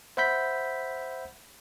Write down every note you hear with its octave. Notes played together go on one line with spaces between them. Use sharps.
C5 E5 F#5 B5 G6 B6